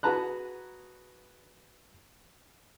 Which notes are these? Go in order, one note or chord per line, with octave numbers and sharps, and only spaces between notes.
F#4 G#4 B4 A5 A#5 F#6